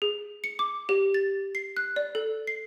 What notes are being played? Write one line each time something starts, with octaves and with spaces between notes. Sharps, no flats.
G#4
C#7
D6
G4
A6
C7
F#6
D5
A4
C7